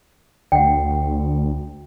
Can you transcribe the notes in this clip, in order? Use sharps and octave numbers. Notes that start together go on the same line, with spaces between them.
D2 F#5 G5